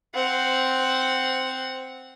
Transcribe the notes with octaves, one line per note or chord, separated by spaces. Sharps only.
C4 F#5